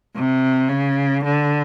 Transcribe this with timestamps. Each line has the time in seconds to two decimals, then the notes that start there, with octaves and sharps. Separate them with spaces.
0.16 C3
0.69 C#3
1.24 D3